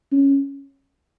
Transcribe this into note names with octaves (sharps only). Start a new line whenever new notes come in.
C#4